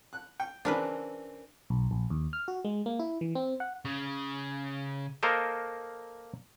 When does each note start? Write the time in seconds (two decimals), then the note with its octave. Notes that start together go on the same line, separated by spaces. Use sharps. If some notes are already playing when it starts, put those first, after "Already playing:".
0.13 F#6
0.40 G5
0.65 C#3 E3 C4 D4 A#4 B4
1.70 B1
1.91 A#1
2.10 D#2
2.33 F6
2.48 F#4
2.65 G#3
2.86 A#3
2.99 E4
3.21 E3
3.35 C4
3.60 F#5
3.85 C#3
5.23 A#3 A4 A#4 C5 D#5